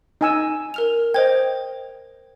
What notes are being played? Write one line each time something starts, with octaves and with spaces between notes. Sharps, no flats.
D#4 G#5 E6
A#4 F6 F7
C5 D#5 G5 G#6